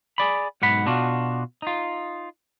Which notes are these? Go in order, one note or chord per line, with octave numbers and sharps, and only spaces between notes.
G#4 D5 B5
B1 G#2 F#5 B5
B2 D4 F4 F#4
D#4 F4